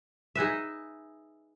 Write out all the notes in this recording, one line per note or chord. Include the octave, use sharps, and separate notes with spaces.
D#4 G#4 B4 E5